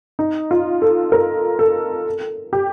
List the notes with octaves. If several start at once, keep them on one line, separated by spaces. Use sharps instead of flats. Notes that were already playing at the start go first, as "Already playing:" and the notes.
D#4
F4
A4
A#4
A4
G4